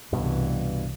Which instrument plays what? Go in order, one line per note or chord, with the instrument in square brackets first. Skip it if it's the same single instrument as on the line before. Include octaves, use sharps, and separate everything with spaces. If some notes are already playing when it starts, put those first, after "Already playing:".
[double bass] C2 E3 [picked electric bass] G2 B2